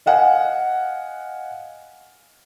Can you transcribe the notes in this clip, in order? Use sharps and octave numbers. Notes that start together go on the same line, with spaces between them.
D#5 F5 F#5 G#5